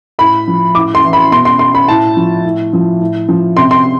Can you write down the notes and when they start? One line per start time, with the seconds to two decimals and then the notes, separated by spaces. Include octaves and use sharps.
0.19 A2 B5
0.48 F3
0.75 A2 D6
0.95 C6
1.03 E3
1.13 B5
1.31 B2 C6
1.45 C6
1.59 C6
1.75 B5
1.88 A2 A5
2.17 F3
2.45 A2
2.73 F3
3.01 A2
3.29 F3
3.57 C3 C6
3.71 C6